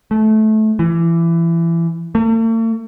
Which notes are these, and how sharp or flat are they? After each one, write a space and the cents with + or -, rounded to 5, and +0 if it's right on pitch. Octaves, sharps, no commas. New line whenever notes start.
A3 -20
E3 +25
A3 +45